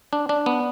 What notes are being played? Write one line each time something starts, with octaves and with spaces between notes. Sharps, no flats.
D4
D4
B3